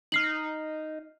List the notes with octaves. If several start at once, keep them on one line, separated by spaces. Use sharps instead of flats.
D#4 F6 C7 F#7